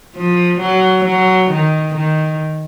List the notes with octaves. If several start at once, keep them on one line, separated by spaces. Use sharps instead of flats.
F3
F#3
F#3
D#3
D#3